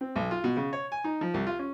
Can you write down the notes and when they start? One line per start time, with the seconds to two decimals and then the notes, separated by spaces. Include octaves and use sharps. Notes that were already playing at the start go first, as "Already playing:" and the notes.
0.01 C4
0.16 B1
0.31 F4
0.44 B2
0.57 C#3
0.73 C#5
0.92 G#5
1.04 D#4
1.21 F3
1.34 C2
1.47 F4
1.59 C#4